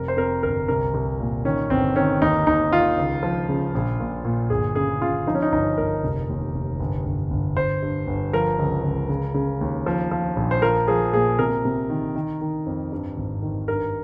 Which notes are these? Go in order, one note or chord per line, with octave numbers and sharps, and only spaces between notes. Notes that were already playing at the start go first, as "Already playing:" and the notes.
Already playing: F1 F2 A#4
C5
F2 A#4
G1 A#4
C2 A#4
C2
A#2
D#3 C#4
G1 C4
D#3 C#4
D#2 D#4
D#2 D#4
D#3 F4
C#2
F3
C#3
A#1
A#2
A#2
G1 G#4
C#3 G#4
C#3 F4
F3 D#4
C#4
D#4
G1 D#4
G1 A#4
F1
D#2
F1
G1
G1
G1
G1 C5
G2
G1
F3 A#4
C#2
C#2
C#3
C#3
D#2
F3
F3
A#1
C5
F3 A#4
F3 G#4
A#2 G#4
C3 A#4
C3
D#3
D#3
D#3
F2
G2
G#1
D#3
G2 A#4